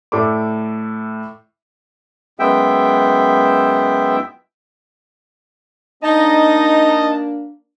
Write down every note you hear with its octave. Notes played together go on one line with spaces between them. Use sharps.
A2 A3 D5 D6
F#2 G#3 B3 E5 G5
A#3 D4 D#4 D#5 A5